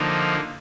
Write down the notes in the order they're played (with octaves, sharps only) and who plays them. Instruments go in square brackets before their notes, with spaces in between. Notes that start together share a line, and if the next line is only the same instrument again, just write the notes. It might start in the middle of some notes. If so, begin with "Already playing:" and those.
Already playing: [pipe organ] D3 F3 A#3 D#4